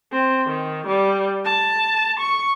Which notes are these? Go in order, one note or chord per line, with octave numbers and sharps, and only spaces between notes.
C4
D#3
G3
A5
C#6